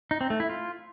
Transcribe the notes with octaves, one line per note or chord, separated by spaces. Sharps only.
D#4
C4
A3
E4
F4